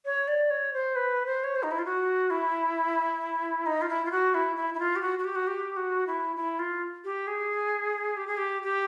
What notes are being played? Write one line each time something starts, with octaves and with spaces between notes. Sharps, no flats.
C#5
D5
C#5
C5
B4
C5
C#5
C5
D#4
E4
F4
F#4
E4
D#4
F4
E4
F4
F#4
E4
E4
E4
F4
G4
F#4
F#4
G4
F#4
G4
F#4
E4
E4
F4
G4
G#4
G4
G#4
G4
G4